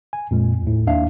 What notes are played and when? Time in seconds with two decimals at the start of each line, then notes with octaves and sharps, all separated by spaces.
0.13 G#5
0.31 F2 A#2 G#3
0.63 D#2 A2
0.87 D#2 D4 E5 F5